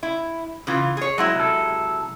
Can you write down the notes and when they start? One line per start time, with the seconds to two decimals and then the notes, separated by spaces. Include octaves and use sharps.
0.03 E4
0.67 C#3 E3 F4
0.97 G#4 C#5
1.18 F#3 G#3 C4 E4
1.35 C3 A4